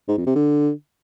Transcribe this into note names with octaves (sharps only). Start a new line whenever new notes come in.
G#2
F2
C3
D3